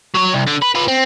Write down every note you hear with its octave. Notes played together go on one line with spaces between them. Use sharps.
F#3 C#5
C2
D3
B4
F4 B4
C4